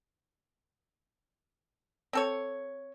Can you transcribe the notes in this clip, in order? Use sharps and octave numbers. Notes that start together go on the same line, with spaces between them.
C4 A4 C#5